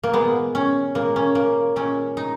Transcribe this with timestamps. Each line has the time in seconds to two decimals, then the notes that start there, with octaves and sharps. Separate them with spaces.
0.03 A#3
0.14 A#2 G#3 B3
0.55 C#4
0.95 A#2 G#3 A#3
1.16 C#4
1.35 A#3
1.76 A#2 G#3 C#4
2.17 D#4